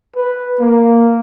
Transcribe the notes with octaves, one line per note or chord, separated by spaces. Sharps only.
B4
A#3